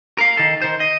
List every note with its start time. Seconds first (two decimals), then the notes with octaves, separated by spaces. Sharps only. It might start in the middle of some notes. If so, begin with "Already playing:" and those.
0.18 A#4 F5
0.37 D#3 A4
0.62 D#3 C5
0.80 D#5